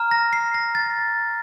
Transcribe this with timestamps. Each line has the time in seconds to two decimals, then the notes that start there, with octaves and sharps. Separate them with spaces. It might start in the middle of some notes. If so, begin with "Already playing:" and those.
Already playing: A#5 F6
0.11 A#6
0.33 C7
0.54 A#6
0.75 A6